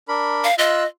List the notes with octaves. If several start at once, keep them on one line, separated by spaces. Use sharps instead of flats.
D4 A#4 B5
F5
F4 D#5 E6 F#6